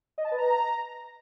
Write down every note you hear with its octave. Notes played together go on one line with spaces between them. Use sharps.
D#5
A5
B4
A#5